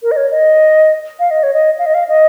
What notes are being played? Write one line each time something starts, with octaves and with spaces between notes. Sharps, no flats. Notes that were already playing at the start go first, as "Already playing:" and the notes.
A#4
D#5
C#5
D#5
F5
D#5
C#5
D#5
F5
D#5
F5
D#5